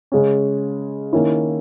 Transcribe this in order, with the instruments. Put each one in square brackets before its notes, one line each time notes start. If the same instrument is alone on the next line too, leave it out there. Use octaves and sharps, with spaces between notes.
[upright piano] C#3 G#3 C#4
D#3 A#3 C#4 E4